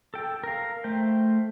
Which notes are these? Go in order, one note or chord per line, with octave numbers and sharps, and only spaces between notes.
A4 G5
A#4 F5
A3 C5 G5